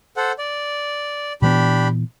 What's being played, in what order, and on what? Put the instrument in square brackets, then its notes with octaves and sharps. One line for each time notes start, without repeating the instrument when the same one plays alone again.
[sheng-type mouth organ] A4 C5 F#5
D5
[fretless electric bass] A#2 E3 B3 [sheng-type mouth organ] D4 G4 B5